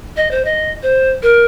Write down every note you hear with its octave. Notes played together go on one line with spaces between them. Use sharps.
D#5
C5
D#5
C5
A#4